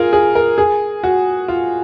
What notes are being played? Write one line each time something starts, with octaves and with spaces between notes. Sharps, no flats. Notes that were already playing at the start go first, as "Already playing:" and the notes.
Already playing: F4 G#4 A#4
G#4
A#4
G#4
F#4
F4